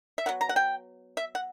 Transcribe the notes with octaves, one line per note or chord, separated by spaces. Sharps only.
E5
F#3 B3 F#5
A#5
F#5
G5
E5
F#5